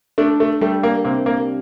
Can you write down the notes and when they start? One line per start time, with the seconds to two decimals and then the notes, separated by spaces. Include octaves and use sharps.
0.18 A3 D4
0.40 A3
0.61 G3 A3
0.83 A#3
1.05 C3 A#3
1.26 A#3